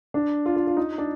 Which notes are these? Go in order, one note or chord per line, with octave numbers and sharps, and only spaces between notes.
D4
F4
F4
F4
D#4
D4